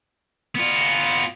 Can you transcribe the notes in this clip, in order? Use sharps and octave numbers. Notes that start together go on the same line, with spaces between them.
B3 F4